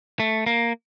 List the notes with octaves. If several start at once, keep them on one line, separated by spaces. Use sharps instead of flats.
A3
A#3